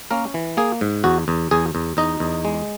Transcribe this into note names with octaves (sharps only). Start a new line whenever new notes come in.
A#3 C#4 A#4
E3
A#3 G#4
G#2
E2 F#4
E2
E2 G#4
E2
E2 D#4 D#5
E2
G#3